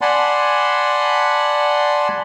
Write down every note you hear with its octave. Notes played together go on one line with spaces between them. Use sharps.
D5 F#5 G#5 A5 B5 C6